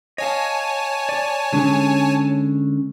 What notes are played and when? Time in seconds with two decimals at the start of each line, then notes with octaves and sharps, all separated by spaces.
0.18 C#5 D#5 F5 G#5 A5
1.09 D5
1.53 D3 G#3 C#4